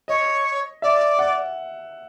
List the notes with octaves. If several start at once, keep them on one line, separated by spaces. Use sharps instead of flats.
C#5 D#5
D5 E5
F#5